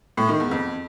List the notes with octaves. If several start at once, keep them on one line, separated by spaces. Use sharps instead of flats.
A2
D#3
E2
F2